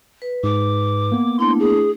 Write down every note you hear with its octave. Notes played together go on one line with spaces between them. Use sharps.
B4
G#2 D6
A#3 B3
A3 D4 E4 C6
G#4